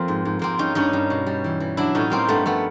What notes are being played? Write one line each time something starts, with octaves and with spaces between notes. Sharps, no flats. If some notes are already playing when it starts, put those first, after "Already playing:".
Already playing: F2 F3 A#3 C4
G#2
G#2
G#2 A#3 C4
G3 C#4 D#4
G2 C#4 D#4
G2
B2
G3
E3
E3
F#3 D4 E4
A2 C#4 D#4
G3 A#3 C4
G2 A3 B3
F3 A3 B3